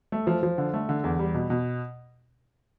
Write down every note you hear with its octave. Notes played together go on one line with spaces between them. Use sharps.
A3
F3
F3
D3
A3
D3
E2
G3
B2
B2